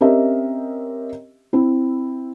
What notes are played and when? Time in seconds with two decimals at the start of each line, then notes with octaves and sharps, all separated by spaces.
0.01 C4 C#4 G4 A#4 D#5 E5
1.53 C4 E4